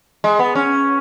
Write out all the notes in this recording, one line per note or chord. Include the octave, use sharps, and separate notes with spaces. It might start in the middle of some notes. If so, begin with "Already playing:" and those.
G#3
B3
C#4